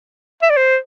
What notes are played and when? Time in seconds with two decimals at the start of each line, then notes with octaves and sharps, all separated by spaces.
0.42 E5
0.50 D5
0.57 C5